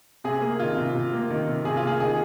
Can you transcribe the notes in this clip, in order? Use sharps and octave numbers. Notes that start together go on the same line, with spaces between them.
C3 G#4
A#3
D#3 F4
C3
C3
A#3
D#3
C3
C3 G#4
F4
A#3 G#4
D#3 G#4